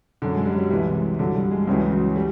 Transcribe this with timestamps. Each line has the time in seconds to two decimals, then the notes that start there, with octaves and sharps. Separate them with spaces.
0.22 F#2 D3
0.34 G#3
0.46 G3
0.54 F#3
0.58 G3
0.71 C2 C3 E3
0.95 G#3
1.19 G2 D3 F#3
1.35 G3
1.51 G#3
1.67 C#2 C#3 E3 F#3
1.92 F#3
2.16 G3